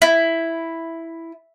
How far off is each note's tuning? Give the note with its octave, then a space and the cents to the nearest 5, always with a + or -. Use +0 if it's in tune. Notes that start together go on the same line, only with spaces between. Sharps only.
E4 +0